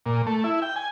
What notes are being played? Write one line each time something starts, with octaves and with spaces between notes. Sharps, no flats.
A#2
A3
E4
G5
G#5